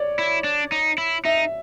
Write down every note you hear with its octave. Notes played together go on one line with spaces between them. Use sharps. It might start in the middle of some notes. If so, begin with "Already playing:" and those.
Already playing: C#5 D5
E4
D4
D#4
E4
D#4 E5